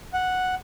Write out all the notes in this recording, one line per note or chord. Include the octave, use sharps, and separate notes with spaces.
F#5